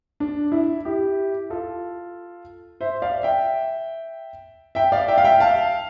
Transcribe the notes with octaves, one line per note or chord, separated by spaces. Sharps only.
D4
E4
E4 G4
F4 A4
C5 E5
D5 F5
E5 G5
E5 G5
D5 F5
E5 G5
F5
E5 G5
F5 A5